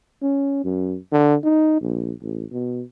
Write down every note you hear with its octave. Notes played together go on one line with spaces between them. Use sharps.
C#4
F#2
D3
D#4
A#1
A1
B2